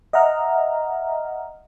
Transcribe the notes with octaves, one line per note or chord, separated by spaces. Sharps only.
D#5 E5 F#5 A#5 F6